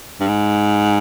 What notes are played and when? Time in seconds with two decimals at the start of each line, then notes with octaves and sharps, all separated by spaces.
0.20 G2
0.28 G#2